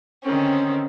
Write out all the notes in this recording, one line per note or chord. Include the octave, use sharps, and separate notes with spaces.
D3 D#3 C4 C#4